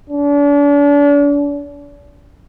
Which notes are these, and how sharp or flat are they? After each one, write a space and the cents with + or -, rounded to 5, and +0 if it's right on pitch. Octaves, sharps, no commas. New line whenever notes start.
D4 -40